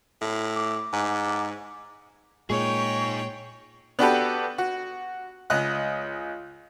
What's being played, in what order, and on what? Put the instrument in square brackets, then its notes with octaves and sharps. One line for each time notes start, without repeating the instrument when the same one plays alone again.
[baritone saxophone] A2
[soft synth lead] D6
[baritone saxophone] G#2
[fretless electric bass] A#2 G#3 [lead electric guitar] D#4 G#4 [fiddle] C#5 G5 [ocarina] C#6
[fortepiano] B3 D4 F#4 G4 A4 B4
F#4
C#2 D#5 F#6